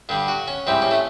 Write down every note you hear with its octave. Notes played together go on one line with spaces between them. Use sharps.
G2 D3 G3
F#4
C#4
G#2 E3 G3 C4
C#4
A3